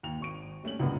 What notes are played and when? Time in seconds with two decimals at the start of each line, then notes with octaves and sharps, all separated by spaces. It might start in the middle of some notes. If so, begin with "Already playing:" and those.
0.03 D#2 F7
0.20 G#1 C#6 D7
0.64 G3 A3 C#4 F#7
0.80 C#2 F#2 A2 D3 G#3 B3